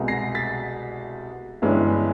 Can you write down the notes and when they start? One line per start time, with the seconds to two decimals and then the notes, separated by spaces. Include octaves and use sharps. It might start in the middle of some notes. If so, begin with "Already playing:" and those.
Already playing: C2 B2 G#3
0.08 A#6 C7
0.35 A6 B6
1.62 G1 G2 E3 G#3 C#4